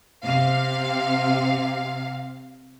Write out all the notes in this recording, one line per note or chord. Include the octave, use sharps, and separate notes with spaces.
C3 F5